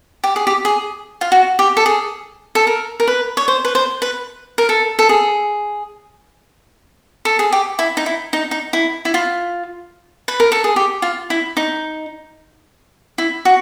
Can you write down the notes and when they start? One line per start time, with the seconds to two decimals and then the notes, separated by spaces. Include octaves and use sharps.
0.24 G4
0.36 G#4
0.47 G4
0.65 G#4
1.21 F4
1.32 F#4
1.59 G4
1.77 A4
1.86 G#4
2.55 A4
2.67 A#4
3.00 A#4
3.08 B4
3.37 C#5
3.48 C5
3.65 B4
3.75 C5
4.02 B4
4.58 A#4
4.69 A4
4.99 A4
5.09 G#4
7.25 A4
7.39 G#4
7.52 G4
7.79 E4
7.97 D#4
8.06 E4
8.33 D#4
8.51 D#4
8.73 E4
9.05 E4
9.14 F4
10.28 B4
10.40 A#4
10.52 A4
10.64 G#4
10.76 G4
11.02 F4
11.30 E4
11.57 D#4
13.18 E4
13.45 F#4